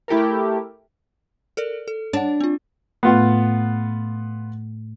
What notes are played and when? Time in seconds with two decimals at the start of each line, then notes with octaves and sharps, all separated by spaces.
0.08 A3 E4 G4 A4 A#4
1.57 A4 A#4 D5
1.88 A4
2.13 D4 C#5 F#5
2.40 C4 F4
3.03 A2 A3 B3 F4 F#5